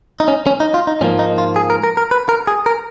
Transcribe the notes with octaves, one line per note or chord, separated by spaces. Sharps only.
D#4
C#4
C#4
D#4
F4
D#4
G#2 F3 A#3 C#4
D#4
F4
G#4
A#4
A#4
A#4
B4
A#4
G#4
A#4